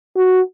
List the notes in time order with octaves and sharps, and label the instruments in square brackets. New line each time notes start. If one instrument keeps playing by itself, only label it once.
[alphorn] F#4